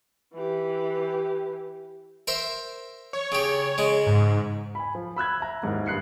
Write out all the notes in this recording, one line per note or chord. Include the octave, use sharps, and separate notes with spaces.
E3 G4
A#4 C5 E5
C#5
C#3 G4
C#3 G#3
G#2
G#5 B5
F3
B5 E6 F#6 G#6
E5 A#5
D#2 G#2 D#3 E4 A#4
G2 D#6 F#6 C7 C#7